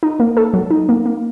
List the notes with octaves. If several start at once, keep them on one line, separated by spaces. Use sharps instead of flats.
D#4
A#3
A4
F#3
D#4
A#3
A#3